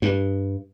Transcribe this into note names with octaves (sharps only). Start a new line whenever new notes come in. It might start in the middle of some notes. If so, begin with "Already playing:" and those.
G2